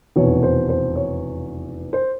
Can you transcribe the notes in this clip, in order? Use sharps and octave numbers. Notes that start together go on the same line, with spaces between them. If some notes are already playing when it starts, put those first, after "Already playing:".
F1 E2 B2 C#5
C5
C5
C#5
C5